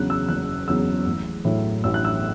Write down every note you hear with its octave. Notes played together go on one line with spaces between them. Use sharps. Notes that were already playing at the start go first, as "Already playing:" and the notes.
Already playing: E2 C#3 F#3 F#6
E6
F#1 F#6
E2 C#3 F#3 E6
A1
A2 F#3
A1 E6
F#6
E6